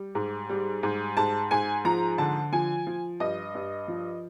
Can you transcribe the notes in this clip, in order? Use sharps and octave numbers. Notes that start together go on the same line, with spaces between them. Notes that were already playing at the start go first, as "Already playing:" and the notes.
Already playing: G3
G#2
G3
G#2
G#2 A5
G#2 G#5
F3 A#5
D3 A5
F3 G#5
F3
G2 D#5
G2
F3